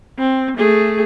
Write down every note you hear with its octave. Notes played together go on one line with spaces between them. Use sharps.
C4
A3 G#4